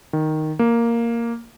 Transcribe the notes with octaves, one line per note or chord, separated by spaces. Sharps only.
D#3
A#3